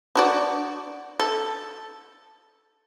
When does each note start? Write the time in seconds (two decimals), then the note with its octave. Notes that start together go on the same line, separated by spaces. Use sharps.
0.15 D4 F#4 D5
1.20 A4